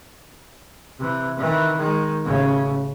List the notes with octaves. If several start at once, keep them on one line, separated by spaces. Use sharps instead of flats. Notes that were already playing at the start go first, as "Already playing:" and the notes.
C3 E3
D#3 E3
D#3 G#3
A1 C#3